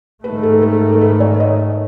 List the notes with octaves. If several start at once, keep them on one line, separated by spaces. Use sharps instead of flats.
G#2 D#3 A3 B4
A4
A4
A4
B4
C#5
D#5